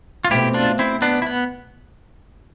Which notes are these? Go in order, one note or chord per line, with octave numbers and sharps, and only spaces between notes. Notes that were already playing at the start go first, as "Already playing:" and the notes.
F4
B2 A3 C4 E4 G4
D4 F4
C4 E4
B3 D4
E4
B3